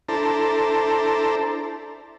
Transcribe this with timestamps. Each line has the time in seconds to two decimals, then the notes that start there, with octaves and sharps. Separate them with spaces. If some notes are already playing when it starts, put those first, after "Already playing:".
0.09 D4 E4 A4 C5 A5 A#5